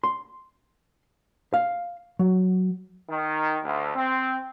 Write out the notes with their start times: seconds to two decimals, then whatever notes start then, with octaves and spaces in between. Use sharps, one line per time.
0.04 C6
1.54 F5
2.19 F#3
3.09 D#3
3.64 D2
3.96 C4